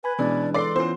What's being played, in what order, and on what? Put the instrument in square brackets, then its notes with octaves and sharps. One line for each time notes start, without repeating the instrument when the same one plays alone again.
[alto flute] B4 [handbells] G#5 B5 G#6
[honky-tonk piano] B2 [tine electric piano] E3 G#3 [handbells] C#4 D4 B4 [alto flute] D5
[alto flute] A4 [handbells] B4 C6 [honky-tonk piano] D5 D6 C7
[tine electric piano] E3 C#4 [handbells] B3 F4 [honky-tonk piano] C5